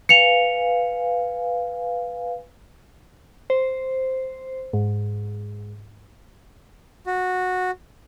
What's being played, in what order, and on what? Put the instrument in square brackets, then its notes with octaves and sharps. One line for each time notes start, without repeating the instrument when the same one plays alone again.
[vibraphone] B4 F5 G#5 [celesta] C#7 F7
[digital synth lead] C5
G#2
[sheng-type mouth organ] F#4